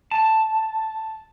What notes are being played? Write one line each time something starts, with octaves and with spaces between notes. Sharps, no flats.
A5